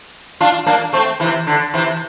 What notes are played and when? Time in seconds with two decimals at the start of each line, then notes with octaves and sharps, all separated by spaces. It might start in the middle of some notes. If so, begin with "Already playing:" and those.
0.41 D4 F4
0.66 A#3 D4
0.93 A3 C4
1.20 C3 E3
1.47 D3
1.74 C3 E3